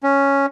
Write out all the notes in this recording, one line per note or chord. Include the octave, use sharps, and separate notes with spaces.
C#4